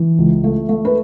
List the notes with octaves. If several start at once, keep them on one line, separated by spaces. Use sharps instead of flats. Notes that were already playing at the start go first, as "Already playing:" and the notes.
Already playing: E3
C#2
A3
A3
B4